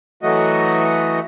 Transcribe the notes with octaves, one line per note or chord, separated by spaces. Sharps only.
E3 F#3 A3 F#4 D#5